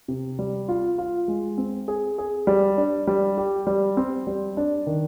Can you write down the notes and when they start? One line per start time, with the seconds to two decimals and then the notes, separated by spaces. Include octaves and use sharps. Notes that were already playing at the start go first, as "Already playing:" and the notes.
0.08 C3
0.39 G3
0.69 F4
0.98 F4
1.28 G#3
1.58 C4
1.88 G#4
2.18 G#4
2.47 G3
2.77 D4
3.07 G3
3.38 G4
3.67 G3
3.97 C4
4.27 G3
4.57 D4
4.87 D#3